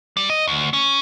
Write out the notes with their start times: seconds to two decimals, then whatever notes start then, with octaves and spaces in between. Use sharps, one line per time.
0.17 G3
0.30 D#5
0.48 D2
0.73 C#4